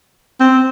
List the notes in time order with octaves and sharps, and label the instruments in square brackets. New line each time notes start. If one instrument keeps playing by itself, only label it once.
[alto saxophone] C4